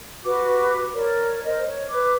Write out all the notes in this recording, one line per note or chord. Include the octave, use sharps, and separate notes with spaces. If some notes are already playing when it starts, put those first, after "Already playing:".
F#4 G4 B4 D6
A#4 C#5 D5
A#4 C5 D#5
C#5
B4 D6